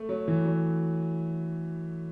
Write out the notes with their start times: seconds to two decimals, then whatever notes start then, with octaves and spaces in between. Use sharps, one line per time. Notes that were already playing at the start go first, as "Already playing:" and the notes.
Already playing: A3
0.09 F#3
0.28 E3
0.45 F#3